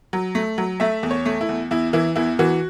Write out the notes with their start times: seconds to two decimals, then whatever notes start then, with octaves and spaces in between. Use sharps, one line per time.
0.13 F#3
0.35 A3
0.58 F#3
0.80 A3 E5
1.03 E2
1.11 C#5
1.26 A3
1.41 E4
1.49 E2
1.71 E2 E4
1.93 E3 E4
2.16 E2 E4
2.39 E3 F#4